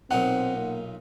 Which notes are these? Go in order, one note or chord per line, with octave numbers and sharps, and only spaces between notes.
B1 A#2 C4 D#4 F#5
A#3